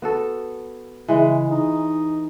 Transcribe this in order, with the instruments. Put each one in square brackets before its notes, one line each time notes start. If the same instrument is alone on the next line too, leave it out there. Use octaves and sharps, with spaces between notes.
[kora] B3 F#4 A4
[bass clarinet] C#3 [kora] E3 G#3
[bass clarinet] D#4